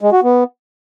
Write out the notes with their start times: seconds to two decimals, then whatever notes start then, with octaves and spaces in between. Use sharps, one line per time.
0.01 G#3
0.12 F#4
0.23 B3